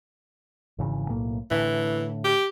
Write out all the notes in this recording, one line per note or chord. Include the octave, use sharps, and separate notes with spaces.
G#1 C#3 E3
B1 A2 A#3
A2 D3 E3
G4